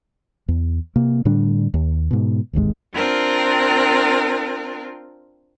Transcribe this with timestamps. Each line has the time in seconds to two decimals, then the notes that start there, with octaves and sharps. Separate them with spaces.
0.48 E2
0.96 C3 A#3
1.25 A2 D3 G3 D4
1.74 D#2
2.11 G#2 B2
2.53 D1 G#1 D#2 G#3
2.93 C4 D4 F4 A#4